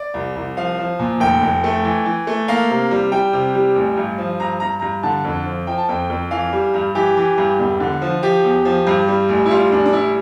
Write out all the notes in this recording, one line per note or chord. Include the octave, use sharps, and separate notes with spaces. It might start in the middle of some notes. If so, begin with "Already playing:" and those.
Already playing: D5
C2
C2
F3 F5
F3
A#2
F1 G5
F1
A3
E3
E3
A3
A#3 F5
C3
G3
G3 G5
C3
G3
A1
G2
F3
G2 A#5
G2 A#5
G2 A#5
D3 A5
F2
F3
F3 G5
A5
F2 G5
F2
E3 F5
G3
G2
E3 G4
E3
G2
E1
D3
F3
F3 G4
E2
F3
G2
G3
A1
E4
G3 F4
A1 D4
D4
G3 E4